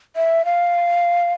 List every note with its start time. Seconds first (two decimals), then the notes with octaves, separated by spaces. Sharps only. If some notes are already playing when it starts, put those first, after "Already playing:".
0.16 E5
0.45 F5